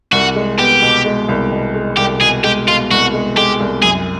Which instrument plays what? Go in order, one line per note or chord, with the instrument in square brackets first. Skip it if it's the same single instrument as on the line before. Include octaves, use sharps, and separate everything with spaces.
[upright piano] C2 [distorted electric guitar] F#4
[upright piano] G#3
[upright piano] B3 [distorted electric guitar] G4
[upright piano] B2
G#3
C2
B2
G#3
[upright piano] C2 [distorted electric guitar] G4
[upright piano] B2 [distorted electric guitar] G#4
[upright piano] G#3 [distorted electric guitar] G4
[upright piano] B2 [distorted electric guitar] F4
[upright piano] C2 [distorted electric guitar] F#4
[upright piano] G#3
[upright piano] G#3 [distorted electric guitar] G4
[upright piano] C2
[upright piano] F#2 [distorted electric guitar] G#4